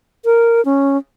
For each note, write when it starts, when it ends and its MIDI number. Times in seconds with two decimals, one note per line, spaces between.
0.25 0.63 70
0.65 0.97 61